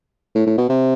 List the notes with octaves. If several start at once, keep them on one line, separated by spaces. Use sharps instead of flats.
A2
A2
B2
C3